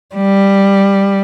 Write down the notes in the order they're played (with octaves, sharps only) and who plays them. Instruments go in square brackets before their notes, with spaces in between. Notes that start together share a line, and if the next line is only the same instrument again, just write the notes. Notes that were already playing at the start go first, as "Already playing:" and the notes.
[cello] G3